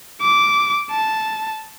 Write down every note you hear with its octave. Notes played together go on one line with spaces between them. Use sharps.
D6
A5